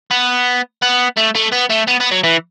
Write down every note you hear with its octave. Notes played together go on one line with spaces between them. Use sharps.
B3
B3
A3
A3
B3
A3
B3
B3
F#3
E3